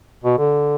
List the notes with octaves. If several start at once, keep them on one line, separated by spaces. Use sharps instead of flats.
B2
D3